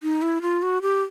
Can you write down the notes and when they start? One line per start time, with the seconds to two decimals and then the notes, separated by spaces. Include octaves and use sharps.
0.03 D#4
0.22 E4
0.42 F4
0.62 F#4
0.82 G4